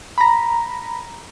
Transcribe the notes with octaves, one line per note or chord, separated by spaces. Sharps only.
A#5 B5